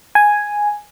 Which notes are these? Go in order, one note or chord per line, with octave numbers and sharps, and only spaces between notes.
G#5